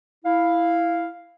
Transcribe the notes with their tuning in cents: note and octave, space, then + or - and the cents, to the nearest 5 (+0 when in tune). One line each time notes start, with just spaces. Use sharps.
E4 +0 F5 +0